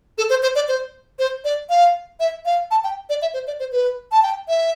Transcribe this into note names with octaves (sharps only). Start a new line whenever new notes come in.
A4
C5
C5
D5
C5
C5
D5
F5
E5
F5
A5
G5
D5
E5
C5
D5
C5
B4
A5
G5
E5